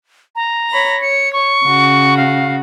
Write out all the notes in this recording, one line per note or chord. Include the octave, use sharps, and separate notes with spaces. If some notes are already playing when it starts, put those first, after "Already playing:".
A#5
C#5 B5 A#6
C#5 C#7
C#6
C#3 F#4
F5